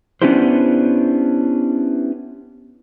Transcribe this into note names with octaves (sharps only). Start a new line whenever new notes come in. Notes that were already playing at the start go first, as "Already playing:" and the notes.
B3 C#4 D4 E4 G4 C5